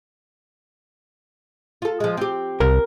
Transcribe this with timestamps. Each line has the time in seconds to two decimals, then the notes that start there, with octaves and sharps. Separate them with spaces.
1.82 F4 A4
2.00 F3 G#3
2.17 C4 G4
2.60 C2 A#4